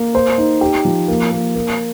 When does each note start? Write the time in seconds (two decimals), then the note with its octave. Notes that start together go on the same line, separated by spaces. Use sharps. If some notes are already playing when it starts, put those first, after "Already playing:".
Already playing: A#3
0.15 C5
0.38 D#4
0.61 G4
0.85 F3
1.08 A#3
1.32 A#3
1.55 A#3